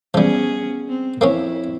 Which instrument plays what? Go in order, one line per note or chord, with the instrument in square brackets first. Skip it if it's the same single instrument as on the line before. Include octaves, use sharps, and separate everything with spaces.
[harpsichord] F3 G3 [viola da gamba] B3 C#4 G#4
[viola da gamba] C4
[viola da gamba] F2 E4 [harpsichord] A#3 C4 C#4